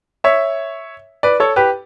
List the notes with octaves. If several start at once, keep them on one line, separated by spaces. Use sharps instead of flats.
C#5 E5
B4 D5
A4 C#5
G4 B4